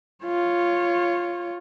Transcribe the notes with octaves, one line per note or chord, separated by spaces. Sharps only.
F4 C#5